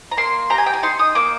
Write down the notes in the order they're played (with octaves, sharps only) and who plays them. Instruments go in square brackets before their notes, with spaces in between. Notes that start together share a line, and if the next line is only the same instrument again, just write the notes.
[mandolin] A#5
A#3 C6
G4 A#5
G#5
G5
G#5
D#4 C6
D#6
A#3 D6